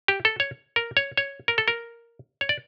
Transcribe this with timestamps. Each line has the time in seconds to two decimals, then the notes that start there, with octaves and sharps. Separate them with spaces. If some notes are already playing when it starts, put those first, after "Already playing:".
0.08 G4
0.25 A4
0.40 C#5
0.76 A#4
0.97 C#5
1.17 C#5
1.48 A#4
1.58 A4
1.68 A#4
2.41 C#5
2.49 D5